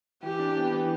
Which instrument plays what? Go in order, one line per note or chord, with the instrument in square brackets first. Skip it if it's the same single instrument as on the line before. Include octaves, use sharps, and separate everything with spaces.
[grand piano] E3 [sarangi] G4
[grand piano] D4
B3
E3